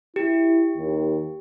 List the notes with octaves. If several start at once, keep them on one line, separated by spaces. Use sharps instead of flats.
E4 G4
D#2